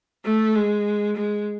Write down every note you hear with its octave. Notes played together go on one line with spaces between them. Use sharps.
A3
G#3
G#3